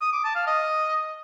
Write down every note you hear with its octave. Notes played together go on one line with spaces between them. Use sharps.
D#6
D6
A5
F5
D#5